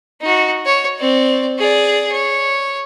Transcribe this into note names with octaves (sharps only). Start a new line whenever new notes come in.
D#4 F#4
C#5
C4 D5
G#4 D5
C#5